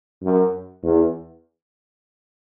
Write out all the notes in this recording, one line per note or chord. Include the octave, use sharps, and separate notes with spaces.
F#2
E2